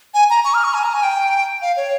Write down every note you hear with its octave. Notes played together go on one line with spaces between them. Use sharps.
G#5
A#5
C#6
F6
C#6
G#5
A#5
G#5
G5
F5
C#5